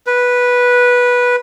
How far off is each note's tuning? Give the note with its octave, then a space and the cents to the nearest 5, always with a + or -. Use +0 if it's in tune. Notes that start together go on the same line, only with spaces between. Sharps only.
B4 -10